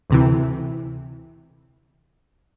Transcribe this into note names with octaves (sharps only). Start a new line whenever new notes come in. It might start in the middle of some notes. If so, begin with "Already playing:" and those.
D2 C3 E3